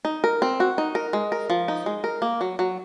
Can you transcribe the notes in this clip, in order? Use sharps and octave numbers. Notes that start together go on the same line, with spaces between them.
D#4
A#4
C4
F#4
D#4
A#4
G#3
A#4
F3
D#4
G#3
A#4
A#3
F#3
F#3